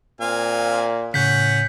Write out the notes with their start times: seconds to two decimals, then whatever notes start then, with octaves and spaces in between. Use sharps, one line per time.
0.21 A#2 C4 F5 G#5
1.14 A2 C#3 C#4 F#5 G6 B6